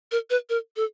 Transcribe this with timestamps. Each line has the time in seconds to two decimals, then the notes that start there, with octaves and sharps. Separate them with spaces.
0.12 A#4
0.30 B4
0.50 A#4
0.76 A4